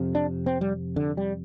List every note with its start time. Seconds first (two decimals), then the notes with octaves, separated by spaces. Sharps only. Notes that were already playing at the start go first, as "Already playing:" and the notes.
Already playing: F2 C3
0.15 D4
0.46 C4
0.61 G3
0.96 D3
1.17 G3